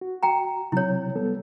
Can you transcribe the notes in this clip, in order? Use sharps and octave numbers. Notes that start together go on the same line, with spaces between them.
F#4
G5 A#5
C3 F#3 E4 C#5
G3 B3 A4